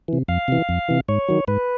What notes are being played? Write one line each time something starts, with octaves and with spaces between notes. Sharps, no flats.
C3 E3
F2 F5
C3 E3
F2
C3 E3
G#2 C#5
D#3 F#3
G#2 B4